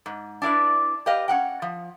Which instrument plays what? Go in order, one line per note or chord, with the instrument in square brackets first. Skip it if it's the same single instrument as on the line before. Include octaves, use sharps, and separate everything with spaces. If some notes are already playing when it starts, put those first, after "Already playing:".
[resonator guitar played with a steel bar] G#2
D4 E4 B4 D5
G4 B4 D#5 F5
C#4 D#4 F#5 G5
F3